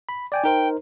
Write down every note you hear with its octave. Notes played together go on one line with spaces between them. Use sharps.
B5
D5 G5 G#5
D#4 A#4 C5 G5